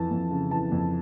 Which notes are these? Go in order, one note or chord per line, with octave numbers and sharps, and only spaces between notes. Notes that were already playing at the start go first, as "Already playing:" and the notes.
Already playing: F2 E3 A5
F2
C#3
E3 A5
F2